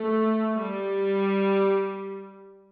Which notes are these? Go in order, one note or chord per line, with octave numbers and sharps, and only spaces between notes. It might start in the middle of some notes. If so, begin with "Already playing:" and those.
Already playing: A3
G3